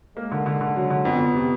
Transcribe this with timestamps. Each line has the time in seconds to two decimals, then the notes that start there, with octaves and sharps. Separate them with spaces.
0.16 G#3 A#3
0.31 D3
0.46 D3
0.61 D3
0.76 F#3
0.90 D3
1.05 F2 B3
1.20 F2
1.35 C3